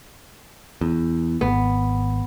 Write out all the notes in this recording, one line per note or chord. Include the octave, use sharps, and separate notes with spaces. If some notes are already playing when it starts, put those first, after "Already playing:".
E2
G#1 B3